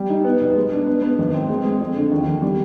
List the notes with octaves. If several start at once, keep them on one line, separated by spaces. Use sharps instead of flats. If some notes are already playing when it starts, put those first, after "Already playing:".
Already playing: G3
D#4
B3
B1
G#3
D4
B3
B3
G#1
C4
G#3
G#3
F2
D3
D#2
D#2
G3